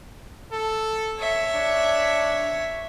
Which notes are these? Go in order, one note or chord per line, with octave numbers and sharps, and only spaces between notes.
A4
C#5 E5
D4